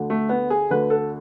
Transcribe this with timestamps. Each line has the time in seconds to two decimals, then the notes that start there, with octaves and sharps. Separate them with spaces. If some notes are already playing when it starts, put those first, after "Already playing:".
Already playing: D2 D3
0.10 A3
0.29 B3
0.50 G#4
0.71 D2 D3 B4
0.90 A4